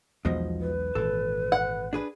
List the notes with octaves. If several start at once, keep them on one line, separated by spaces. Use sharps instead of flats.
B1 E2 B2 F3 G#3 D#5
B4
G#1 A#2 E3 A4
F#5
D4 G#4 B4